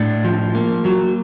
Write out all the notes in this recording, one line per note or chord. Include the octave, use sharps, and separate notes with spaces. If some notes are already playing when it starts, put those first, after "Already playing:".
Already playing: A2 D4
F3
A#3
F#3